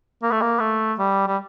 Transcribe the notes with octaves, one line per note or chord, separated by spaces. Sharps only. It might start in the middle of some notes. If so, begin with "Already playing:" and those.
A#3
A3
A#3
A3
G3
G3